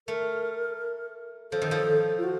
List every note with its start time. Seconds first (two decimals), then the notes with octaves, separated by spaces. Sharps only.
0.07 A3 A#4
1.51 F3 A4
1.62 D#3
1.71 F3
2.18 F4
2.24 F#4